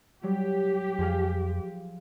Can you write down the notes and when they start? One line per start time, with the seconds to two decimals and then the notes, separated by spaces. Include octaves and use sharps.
0.23 F#3 G3 G4
0.99 F2 F3 G#4 F5